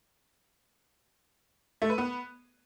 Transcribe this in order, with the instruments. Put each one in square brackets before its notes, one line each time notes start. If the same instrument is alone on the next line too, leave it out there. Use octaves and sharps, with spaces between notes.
[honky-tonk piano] A3
B4
B3